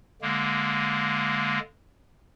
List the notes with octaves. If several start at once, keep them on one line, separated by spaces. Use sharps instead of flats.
D3 G#3 A#3